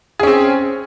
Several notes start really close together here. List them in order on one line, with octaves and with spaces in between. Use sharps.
G#4 C#4 C4